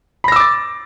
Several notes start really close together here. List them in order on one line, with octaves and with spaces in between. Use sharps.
B5 A#6 E6 D6 A6